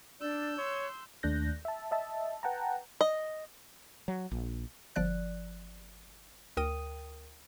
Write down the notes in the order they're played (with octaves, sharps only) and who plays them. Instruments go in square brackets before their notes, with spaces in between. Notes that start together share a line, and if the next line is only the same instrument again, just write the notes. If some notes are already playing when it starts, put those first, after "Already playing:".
[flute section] D4 D5 [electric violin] E6 G6
[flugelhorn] C#5 [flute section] C6
[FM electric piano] D#2 A3 D4 F#6 G6 A#6
E5 A5
D#5 E5 A5
B4 F#5 G5 A5 A#5
[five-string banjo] D#5
[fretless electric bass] F#3
A#1
[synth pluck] G1 F3 D5 F#6
D2 A#4 G5 D#6 D#7